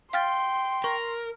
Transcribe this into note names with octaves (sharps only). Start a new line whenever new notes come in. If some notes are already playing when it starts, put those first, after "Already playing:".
F5 G5 C6 F6 A6
A#4 C#6